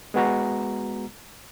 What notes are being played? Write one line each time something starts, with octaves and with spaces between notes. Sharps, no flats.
G#3 B3 F#4 A#5